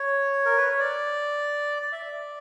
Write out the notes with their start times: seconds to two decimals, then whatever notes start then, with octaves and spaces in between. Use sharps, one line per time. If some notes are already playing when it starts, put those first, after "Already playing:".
Already playing: C#5
0.46 A#4
0.57 B4
0.69 C#5
0.80 D5
1.82 D5
1.92 E5
2.02 D5